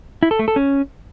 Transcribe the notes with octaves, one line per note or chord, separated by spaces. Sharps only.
E4
A4
A3
A4
C#4